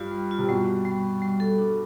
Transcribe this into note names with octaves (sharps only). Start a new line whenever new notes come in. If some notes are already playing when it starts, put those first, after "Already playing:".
Already playing: G2 F4
G3
F4
C3
G2 B2 G3
G3
G3
G3
G3
A4
D4